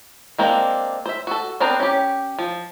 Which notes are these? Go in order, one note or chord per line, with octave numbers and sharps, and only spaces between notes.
G#3 A#3 C4 D4 A#4
C5 E5
F#4 A4
B3 C4 D4 A#4 C5
C#4 G4
F3